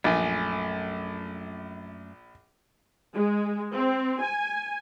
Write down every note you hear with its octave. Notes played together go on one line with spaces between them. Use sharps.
A#1 F#2 A3 G#5
G#3
C4
G#5